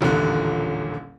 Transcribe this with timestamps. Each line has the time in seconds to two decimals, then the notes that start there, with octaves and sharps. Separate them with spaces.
0.01 D#1 A1 A#2 D3